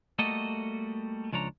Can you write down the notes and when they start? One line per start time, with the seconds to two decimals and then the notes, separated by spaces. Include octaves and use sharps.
0.19 G3 A3 A#3 F#4 A4 D#5
1.33 C#2 F3 D4 C#5 A#5